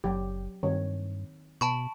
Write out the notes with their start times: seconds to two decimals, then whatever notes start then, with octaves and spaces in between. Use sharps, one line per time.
0.04 F#1 F#3 G4
0.63 G2 D#3 C4 C#5
1.61 B2 A5 B5 C#6